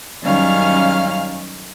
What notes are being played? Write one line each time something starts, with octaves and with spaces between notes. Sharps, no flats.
F#2 D#3 G3 C#4 F5 F6